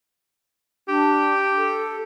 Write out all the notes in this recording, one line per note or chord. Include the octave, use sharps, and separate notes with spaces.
D4 G4
A4